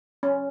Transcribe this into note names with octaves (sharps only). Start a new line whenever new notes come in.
C#4